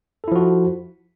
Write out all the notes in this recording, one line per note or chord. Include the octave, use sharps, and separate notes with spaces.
F3 E4 F#4 A4